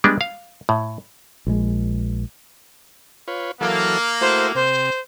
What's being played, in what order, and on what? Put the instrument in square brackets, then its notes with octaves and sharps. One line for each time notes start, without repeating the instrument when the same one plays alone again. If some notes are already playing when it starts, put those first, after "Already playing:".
[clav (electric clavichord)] G3 G#3 B3 D4
F5
A2
[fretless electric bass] A#1 G#3
[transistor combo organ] F4 B4 C#5
[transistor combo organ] E3 F#3 A4 [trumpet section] A#3
[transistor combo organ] A3 E4 F#4 [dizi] C5
[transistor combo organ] C3 [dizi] C5